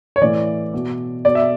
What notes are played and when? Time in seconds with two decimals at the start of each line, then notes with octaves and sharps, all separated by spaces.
0.16 C#5
0.22 A2 E3 D5
0.74 B2
1.25 B2 D5
1.35 E5